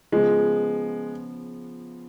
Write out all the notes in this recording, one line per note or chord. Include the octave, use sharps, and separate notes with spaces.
C#3 F3 G#3 B3